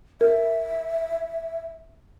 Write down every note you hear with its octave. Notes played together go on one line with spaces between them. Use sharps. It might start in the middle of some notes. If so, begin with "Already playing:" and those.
A#4 E5